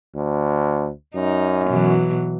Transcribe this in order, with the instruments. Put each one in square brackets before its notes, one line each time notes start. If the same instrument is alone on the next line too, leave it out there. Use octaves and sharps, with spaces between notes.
[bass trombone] D2
[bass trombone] F#2 [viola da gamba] D#4
[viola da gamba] B2 E3 F#3